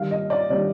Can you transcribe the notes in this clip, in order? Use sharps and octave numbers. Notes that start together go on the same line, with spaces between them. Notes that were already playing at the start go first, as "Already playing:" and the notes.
Already playing: D#3 G3 D4 F5
D#5
D5
D#3 G3 D4 D5